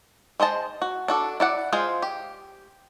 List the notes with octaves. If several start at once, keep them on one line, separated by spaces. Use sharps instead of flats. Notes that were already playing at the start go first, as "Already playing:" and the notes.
G#3 C5 D#5 A5
F#4
D4 F#4 A4
E4 D5 F#5
G#3 F4 G#4 C5
G4